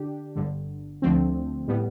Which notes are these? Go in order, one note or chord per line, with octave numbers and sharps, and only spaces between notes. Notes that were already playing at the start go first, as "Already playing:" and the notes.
Already playing: D3 D4 G4
G1 G2 D3
D2 D3 F3 A3 C4
A2 G3 B3